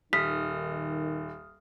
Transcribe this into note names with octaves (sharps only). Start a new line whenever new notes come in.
D#1 D#3 D#6 F6 B6